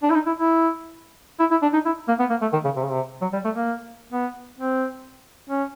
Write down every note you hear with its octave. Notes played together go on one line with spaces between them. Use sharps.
D4
E4
D#4
E4
E4
E4
E4
D4
D#4
E4
A#3
B3
A#3
A3
D#3
C#3
C3
C#3
C3
F#3
G3
A3
A#3
B3
C4
C#4